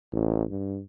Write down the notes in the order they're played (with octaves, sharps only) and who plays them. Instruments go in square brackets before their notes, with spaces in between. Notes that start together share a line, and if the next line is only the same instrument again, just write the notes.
[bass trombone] A1
G2